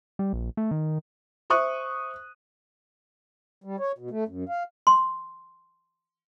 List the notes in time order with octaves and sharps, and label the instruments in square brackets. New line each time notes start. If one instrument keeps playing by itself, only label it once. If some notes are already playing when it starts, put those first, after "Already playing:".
[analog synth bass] G3
A#1
A3
D#3
[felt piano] C5 E5 C#6 D#6 F#6
[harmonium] G3
C#5
B2
A3
F#2
F5
[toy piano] C6